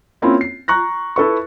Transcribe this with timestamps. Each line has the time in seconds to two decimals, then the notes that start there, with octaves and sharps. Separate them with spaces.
0.22 A#3 C4 C#4 E4 F4
0.41 C7
0.68 A#5 C#6 F#6 A#6
1.16 E4 A4 B4 C#6